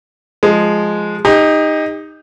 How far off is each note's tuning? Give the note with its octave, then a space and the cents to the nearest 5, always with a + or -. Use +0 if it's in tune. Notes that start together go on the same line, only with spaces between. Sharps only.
F3 +0 G#3 +0
D#4 +0 G4 +35